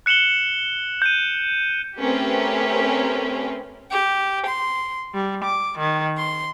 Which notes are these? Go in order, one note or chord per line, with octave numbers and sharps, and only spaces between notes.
F#6 C#7 E7 F#7 G7
G6 D#7
A3 C4 C#4 G4 A#4 B4
G4
C6
G3
D6
D#3
C6